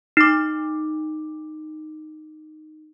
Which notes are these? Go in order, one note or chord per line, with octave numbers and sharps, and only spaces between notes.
D#4 D6